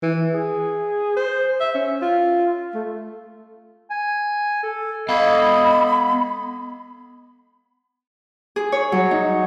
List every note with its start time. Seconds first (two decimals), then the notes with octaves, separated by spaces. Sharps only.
0.03 E3
0.34 G#4
1.16 C5
1.60 E5
1.75 C#4
2.02 F4
2.74 A3
3.90 G#5
4.63 A4
5.09 B3 A4 D#5 F5 B5
8.56 G#4
8.72 C#5
8.92 F#3
9.11 D#4